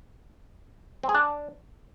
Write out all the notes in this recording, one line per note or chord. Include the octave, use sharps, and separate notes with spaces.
C4
G#4
D4